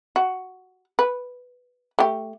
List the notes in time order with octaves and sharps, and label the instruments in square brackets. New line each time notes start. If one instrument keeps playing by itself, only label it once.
[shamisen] F#4
B4
A3 G4